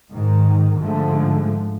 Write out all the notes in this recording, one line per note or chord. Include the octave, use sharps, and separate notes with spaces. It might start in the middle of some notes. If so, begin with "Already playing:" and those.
G#2 D#3
G#2 D3 F3 G#3 A3